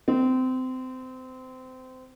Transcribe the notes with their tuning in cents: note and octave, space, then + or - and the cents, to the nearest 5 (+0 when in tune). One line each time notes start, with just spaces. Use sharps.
C4 -25